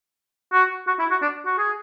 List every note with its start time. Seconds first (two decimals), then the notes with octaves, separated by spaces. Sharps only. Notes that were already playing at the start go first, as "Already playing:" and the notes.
0.53 F#4
0.87 F#4
0.99 E4
1.11 F#4
1.22 D4
1.46 F#4
1.58 G#4